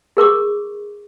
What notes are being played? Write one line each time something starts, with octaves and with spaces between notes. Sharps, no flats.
G#4 A#4 C#6 D6